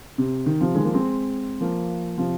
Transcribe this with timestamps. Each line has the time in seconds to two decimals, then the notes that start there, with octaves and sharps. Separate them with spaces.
0.18 C3
0.46 D#3
0.60 C3 F3
0.75 D#3 G#3
0.85 F3 A#3
0.94 G#3 C4
1.61 F3 A#3
2.18 C3 F3